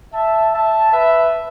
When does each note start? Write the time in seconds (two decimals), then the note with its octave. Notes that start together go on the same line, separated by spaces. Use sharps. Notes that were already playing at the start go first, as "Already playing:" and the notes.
0.13 E5 A5
0.53 E5 A5
0.93 B4 E5